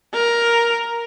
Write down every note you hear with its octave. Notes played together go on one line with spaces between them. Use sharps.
A#4